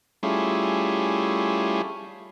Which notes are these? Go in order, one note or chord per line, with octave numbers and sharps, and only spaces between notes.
G3 A3 C#4 E4 F4 G#4